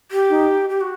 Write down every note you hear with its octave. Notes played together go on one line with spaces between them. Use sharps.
G4
D#4
G4
F#4